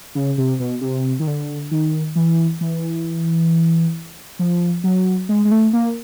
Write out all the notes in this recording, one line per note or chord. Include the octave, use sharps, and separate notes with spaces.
C#3
C3
B2
C3
D#3
D3
D#3
E3
E3
F3
F#3
G#3
G#3
A3
A#3